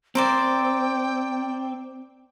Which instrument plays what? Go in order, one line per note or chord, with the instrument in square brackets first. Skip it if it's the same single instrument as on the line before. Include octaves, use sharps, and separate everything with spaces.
[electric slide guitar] C4 [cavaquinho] A#4 C5 D5 [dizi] G5